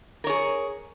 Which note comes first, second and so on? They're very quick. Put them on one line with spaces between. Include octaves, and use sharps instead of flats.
A#4 C#5 G#4